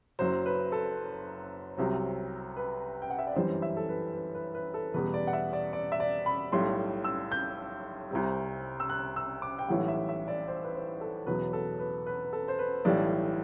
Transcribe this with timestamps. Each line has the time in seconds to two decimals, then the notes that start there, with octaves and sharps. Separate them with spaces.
0.19 F#1 F#2 F#3 C5
0.46 B4
0.72 A4
1.77 C2 C3 F#3
2.57 B4
3.02 G5
3.10 F#5
3.19 E5
3.27 D5
3.36 G1 F#2 E3 G3 C5
3.62 E5
3.77 A4
3.89 B4
4.14 B4
4.35 B4
4.55 B4
4.74 A4
4.94 E2 B2 G3 B4
5.14 D5
5.27 F#5
5.33 E5
5.53 D5
5.73 D5
5.92 E5
6.00 D5
6.26 B5
6.52 B1 A2 G3 C6
7.04 E6
7.32 G6
8.11 C2 C3 G3
8.80 E6
8.90 F#6
9.16 E6
9.42 D6
9.59 G5
9.68 B1 A2 E3 G3 F#5
9.88 E5
10.09 E5
10.28 D5
10.48 C5
10.63 B4
10.74 C5
11.01 A4
11.26 E2 B2 F#3 B4
11.53 A4
11.79 B4
12.06 B4
12.24 B4
12.33 A4
12.48 C5
12.59 B4
12.85 B1 A2 E3 G3 D5